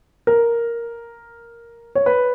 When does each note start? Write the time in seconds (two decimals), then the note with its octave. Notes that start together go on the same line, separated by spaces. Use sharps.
0.27 A#4
1.95 C#5
2.06 B4